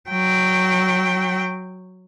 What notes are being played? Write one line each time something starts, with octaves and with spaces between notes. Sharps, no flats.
F#3 G5